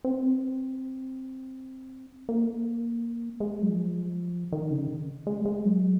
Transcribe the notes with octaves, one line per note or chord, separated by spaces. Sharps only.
C4
A#3
G#3
F#3
F3
D#3
C#3
G#3
G#3
F#3